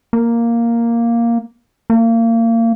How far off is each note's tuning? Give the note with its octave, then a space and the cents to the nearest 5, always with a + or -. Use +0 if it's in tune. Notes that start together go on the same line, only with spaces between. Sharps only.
A#3 +0
A#3 -30